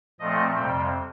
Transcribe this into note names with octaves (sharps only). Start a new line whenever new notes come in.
A#2 F3 A3 C4 D#5
F2 C3 G3 C4 G5